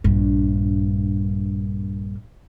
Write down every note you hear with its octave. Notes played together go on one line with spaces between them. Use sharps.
A#1 G2